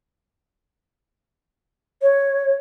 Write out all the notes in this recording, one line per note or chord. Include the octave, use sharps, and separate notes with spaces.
C#5